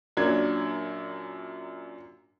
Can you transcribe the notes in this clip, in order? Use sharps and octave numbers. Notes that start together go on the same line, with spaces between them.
F#2 A#2 F#3 D4 G#6